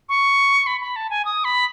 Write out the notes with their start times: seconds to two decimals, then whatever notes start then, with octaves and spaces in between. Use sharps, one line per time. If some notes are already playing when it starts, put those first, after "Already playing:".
0.09 C#6
0.67 B5
0.81 B5
0.96 A5
1.10 G#5
1.25 D#6
1.45 B5